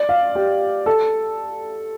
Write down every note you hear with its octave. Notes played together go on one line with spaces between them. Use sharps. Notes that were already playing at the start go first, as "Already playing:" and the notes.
Already playing: D5
F5
G4
A4